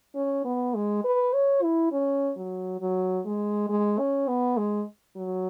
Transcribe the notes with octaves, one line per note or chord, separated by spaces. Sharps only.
C#4
B3
G#3
B4
C#5
E4
C#4
F#3
F#3
G#3
G#3
C#4
B3
G#3
F#3